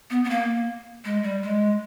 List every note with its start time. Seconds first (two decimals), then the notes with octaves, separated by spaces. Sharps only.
0.11 B3
0.24 B3
0.30 A#3
1.05 G#3
1.23 G3
1.43 G#3